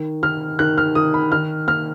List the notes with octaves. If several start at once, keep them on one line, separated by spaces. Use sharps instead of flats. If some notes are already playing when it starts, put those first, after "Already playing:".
Already playing: D#3
D#3 F6
D#3 F#6
F6
D#3 D#6
B5
D#3 F6
A#3 F6